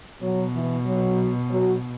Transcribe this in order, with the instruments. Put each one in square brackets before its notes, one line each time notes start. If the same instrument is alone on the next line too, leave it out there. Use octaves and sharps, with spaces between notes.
[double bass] B2 [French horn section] F#3
[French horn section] E3
F#3
F#3